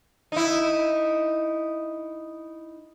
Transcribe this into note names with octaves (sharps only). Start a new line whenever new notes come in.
D#4 E4